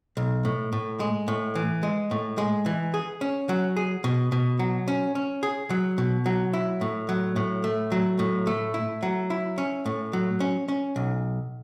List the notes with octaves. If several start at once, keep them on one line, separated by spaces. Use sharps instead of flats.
B1
A2
A2
G#3
A2
E3
G#3
A2
G#3
E3
G#4
C#4
F#3
G#4
B2
B2
F#3
C#4
C#4
G#4
F#3
B2
F#3
E4
A2
F#3
A2
A3
F#3
A2
A3
E4
F#3
E4
C#4
A2
F#3
C#4
C#4
B1